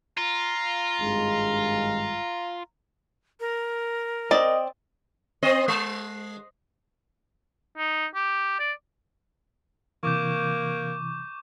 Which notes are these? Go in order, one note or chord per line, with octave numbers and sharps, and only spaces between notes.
F4 A#5
G#1 G2 G#3
A#4
C4 D5 D#5
C4 C5 D#5
G#3
D#4
G4
D5
C3 E3 A#3 C#6 D6 G6